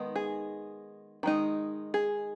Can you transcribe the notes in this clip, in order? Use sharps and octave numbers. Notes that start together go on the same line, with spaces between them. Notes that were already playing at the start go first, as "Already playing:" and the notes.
Already playing: D#3 G#3 B3 D#4
G#4
D#3 G#3 D#4
G#4